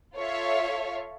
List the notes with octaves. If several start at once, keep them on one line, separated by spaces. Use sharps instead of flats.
F4 A4 C#5 E5 F5